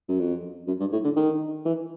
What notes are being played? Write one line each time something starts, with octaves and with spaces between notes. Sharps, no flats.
F#2
F2
F#2
G2
A2
D3
D#3
E3